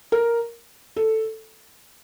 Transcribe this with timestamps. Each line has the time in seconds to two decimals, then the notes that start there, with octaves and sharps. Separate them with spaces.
0.12 A#4
0.96 A4